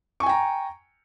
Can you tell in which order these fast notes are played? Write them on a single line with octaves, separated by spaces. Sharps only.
C#6 G#5 G5 A#5